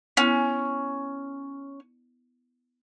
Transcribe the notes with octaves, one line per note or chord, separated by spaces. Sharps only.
B3 C#4 E4